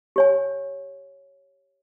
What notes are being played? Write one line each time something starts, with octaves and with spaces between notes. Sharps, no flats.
G4 C#5 G#5